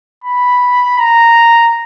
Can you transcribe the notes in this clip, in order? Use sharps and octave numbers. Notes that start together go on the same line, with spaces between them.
B5
A#5